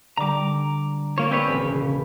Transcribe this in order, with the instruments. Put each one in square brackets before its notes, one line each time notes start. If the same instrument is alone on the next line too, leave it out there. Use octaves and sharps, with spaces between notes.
[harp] D3 G3 [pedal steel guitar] A#5 D6
[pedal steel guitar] A#3 C#5 [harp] F4
[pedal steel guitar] C4 B4 C#5 [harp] G#4 D5
[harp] E1 A#1 B5 [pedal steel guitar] C#3